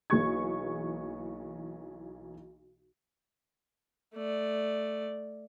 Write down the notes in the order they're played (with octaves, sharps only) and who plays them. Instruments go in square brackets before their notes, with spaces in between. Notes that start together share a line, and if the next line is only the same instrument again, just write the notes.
[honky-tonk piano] B1 E3 A#3 G#4 C#6 G#6
[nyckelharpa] A3 D5